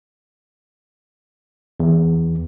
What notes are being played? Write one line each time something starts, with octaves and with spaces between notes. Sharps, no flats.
E2